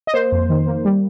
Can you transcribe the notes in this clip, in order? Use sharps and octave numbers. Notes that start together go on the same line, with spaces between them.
D#5
A#3 C5
F2
D#3
A#3
G3